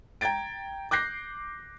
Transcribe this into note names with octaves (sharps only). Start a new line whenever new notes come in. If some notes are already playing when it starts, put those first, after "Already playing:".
G5 A#5 G#6 A6 D7
D6 F#6 G6 A#6 C7